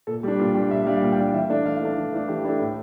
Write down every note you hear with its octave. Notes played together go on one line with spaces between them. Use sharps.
A#2 A4
G3 D4 G4
A#2 F4
G3 D4 G4
A#2 E5
G3 D4 F5
A#2
G5
G3 D4
E3 E5
A3 D4 D5
E3 F5
A3 D4
E3
A3 D4
E3 G4
A3 D4 E4
A2